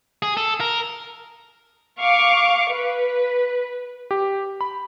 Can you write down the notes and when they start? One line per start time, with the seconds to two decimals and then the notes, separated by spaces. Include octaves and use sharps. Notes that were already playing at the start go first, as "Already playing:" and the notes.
0.22 G#4
0.37 A4
0.60 A#4
2.01 F5 C#6 D6
2.73 B4
4.11 G4
4.61 B5